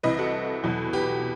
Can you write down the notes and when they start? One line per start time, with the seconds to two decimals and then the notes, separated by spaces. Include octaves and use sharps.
0.03 C2 C3 E3 B4 D#5
0.19 F#4 A4
0.64 E2 B2 F#3
0.93 G4 B4